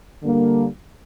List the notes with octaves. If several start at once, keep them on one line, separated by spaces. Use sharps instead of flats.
D3 G3 A#3 D4